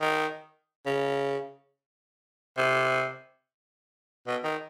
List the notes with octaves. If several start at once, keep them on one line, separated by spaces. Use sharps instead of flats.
D#3
C#3
C3
B2
D#3